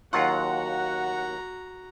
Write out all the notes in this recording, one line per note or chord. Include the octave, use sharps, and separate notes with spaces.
D#2 F#3 F4 F#4 F#5 A#5